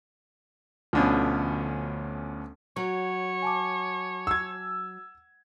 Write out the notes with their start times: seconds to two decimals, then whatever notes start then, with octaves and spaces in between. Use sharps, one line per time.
0.93 D2 B2 D3 F3 C#4
2.76 F#3 C#5
3.42 G#5 A5 D6
4.27 E6 G#6